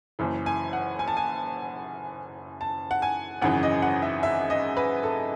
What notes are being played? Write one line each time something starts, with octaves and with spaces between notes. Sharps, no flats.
F#1 F#2 E3
G#5
F#5
G#5
A5
G#5
A5
F#5
G#5
G#1 F#2 C#3 E3 F#5
D#5
F#5
E5
E5
D#5
B4
A4